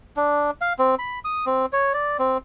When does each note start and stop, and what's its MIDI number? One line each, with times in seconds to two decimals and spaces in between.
0.16 0.51 62
0.61 0.73 77
0.79 0.95 60
0.99 1.19 83
1.25 1.45 87
1.46 1.66 60
1.73 1.93 73
1.94 2.17 74
2.19 2.38 60